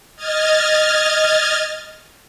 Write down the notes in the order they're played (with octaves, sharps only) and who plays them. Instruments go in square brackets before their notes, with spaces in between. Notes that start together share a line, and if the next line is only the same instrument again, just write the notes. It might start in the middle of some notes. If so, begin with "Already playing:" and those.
[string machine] D#5 F6 G#6 A6